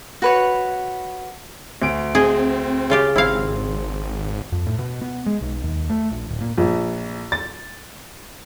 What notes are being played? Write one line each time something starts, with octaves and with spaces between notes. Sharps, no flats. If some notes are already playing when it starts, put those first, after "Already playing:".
F#4 B4 C#5
D2 D7
C4 G#4 D#5
C#3 F4 G4
G#1 C4 E4 F5
F2
A2
B2
B3
G#3
B1
D#2
A3
A#1
D1
A#2
A#1
A6